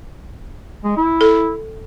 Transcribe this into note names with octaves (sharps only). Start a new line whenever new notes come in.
G#3
E4
A4